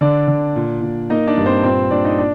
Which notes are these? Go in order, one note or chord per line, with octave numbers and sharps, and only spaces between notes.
D3 D4 D5
D3
A#2
A#2
A#3 D#4 D#5
D4 D5
G2
C4 C5
A#2 C4 C5
A#2 D4 D5
D#4 D#5
D4 D5